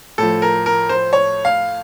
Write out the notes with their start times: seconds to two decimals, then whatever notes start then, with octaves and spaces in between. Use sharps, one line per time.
0.18 A2 F3 A4
0.42 A#4
0.66 A#4
0.89 C5
1.13 C#5
1.45 F5